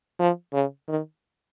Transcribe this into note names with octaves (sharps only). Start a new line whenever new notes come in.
F3
C#3
D#3